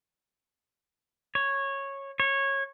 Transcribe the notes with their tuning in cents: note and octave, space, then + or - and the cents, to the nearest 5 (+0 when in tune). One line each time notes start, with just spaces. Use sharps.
C#5 -10
C#5 -15